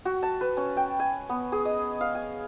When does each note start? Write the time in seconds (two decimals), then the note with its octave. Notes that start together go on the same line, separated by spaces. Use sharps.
0.05 F#4
0.23 A5
0.41 B4
0.57 C#4
0.77 G5
0.99 G#5
1.29 B3
1.52 G#4
1.65 D#5
2.01 F5
2.15 G#5